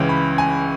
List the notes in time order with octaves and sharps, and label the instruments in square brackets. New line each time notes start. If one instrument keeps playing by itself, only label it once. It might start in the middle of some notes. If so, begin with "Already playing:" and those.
Already playing: [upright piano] C#2 C#3 E3 C#5
B5
G#5